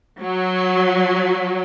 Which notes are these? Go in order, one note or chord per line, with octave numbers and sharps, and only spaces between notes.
F#3